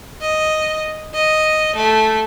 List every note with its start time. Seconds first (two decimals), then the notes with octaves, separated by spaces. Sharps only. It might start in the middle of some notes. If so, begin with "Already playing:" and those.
0.21 D#5
1.14 D#5
1.75 A3